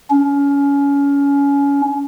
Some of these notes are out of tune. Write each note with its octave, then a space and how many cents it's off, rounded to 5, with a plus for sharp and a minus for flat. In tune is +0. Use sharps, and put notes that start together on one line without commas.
C#4 +25